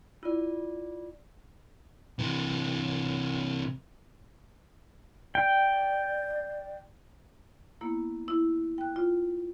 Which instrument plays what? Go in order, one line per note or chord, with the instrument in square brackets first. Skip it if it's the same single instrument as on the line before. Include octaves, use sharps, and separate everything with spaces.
[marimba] E4 [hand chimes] F4 D5
[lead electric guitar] C3 E3
[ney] D5 [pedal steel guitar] G5
[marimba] A#3 B3 E4
E4
G5 F#6
F4